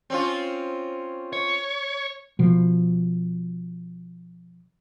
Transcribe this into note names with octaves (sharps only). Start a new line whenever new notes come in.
C4 C#4 F4
C#5
B2 F3